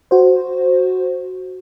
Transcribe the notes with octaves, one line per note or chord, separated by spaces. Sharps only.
F#4 C5